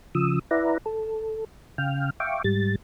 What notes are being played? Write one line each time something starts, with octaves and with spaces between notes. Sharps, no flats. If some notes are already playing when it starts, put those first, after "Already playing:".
C#3 F3 D#6 E6
E4 B4 D5 E5 F#5 A#5
A4
C#3 F5 G5 F6
E5 F5 G5 C#6 D6
G#2 G3 A6